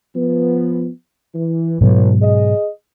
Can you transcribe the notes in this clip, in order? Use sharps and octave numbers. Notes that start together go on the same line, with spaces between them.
F3 B3
E3
A1 G#2 B2 F#3
G#4 D#5